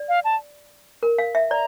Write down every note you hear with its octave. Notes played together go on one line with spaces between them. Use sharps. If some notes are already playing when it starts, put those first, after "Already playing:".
Already playing: D5
F5
A5
A#4
F5
E5
D5 A#5